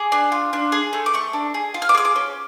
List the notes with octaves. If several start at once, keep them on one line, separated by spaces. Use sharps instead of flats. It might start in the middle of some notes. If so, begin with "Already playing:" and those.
Already playing: G#4 D6
D4
F4
D4
G#4
A3
D6
A3 C#6
D4
G#4
F4
F6
D6
G#4 F6
D6
C#4